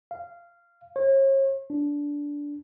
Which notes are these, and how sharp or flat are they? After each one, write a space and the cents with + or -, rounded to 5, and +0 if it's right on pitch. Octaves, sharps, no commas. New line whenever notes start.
F5 -15
C#5 -40
D4 -15